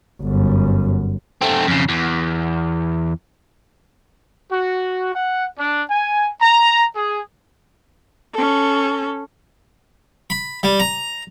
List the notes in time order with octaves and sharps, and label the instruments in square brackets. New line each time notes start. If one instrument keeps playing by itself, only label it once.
[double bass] G1 F#2
[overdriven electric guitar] A3 C4
F2 C#3
E2
[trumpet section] F#4
F#5
D4
G#5
A#5
G#4
[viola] C#4 A4
[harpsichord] B5
G3
A#5